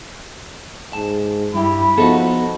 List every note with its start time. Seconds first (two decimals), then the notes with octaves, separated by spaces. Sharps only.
0.93 G#2 A5
1.54 G2 E4 G4 B5
1.98 F3 B3 D#4 F#4 A4